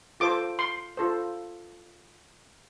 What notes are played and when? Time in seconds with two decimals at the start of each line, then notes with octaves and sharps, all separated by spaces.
0.20 F4 A4 C5 D6
0.59 C6
0.97 F4 A4 C5